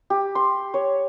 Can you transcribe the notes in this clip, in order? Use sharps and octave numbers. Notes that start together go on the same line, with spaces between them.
G4
C6
C#5